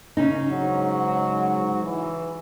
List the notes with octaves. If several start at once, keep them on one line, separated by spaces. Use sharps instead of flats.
C#3 C#4 D#4
G#2 F#3
E3